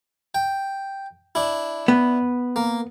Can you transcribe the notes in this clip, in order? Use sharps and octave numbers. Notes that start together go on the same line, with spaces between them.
G5
D4 E4
B3
A#3